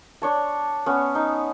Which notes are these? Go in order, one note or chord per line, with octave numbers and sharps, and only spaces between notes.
D4 C#5 A5
B3 C#4
D#4